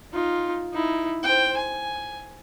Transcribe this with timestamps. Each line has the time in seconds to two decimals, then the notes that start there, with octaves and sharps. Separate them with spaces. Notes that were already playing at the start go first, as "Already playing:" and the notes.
0.13 D#4 F4
0.73 D#4 E4
1.23 C5 G5
1.57 G#5